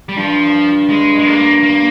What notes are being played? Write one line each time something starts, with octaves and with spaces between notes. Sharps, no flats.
G3
G2 F3
G#3
G#3
A#3
A#3